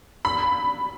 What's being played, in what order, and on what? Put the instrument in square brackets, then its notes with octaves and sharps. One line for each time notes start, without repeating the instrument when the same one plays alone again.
[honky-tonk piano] B5